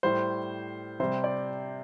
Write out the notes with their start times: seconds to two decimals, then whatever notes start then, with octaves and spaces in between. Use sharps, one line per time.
0.03 A2 G3 C5
1.00 C3 G3 C5
1.24 D5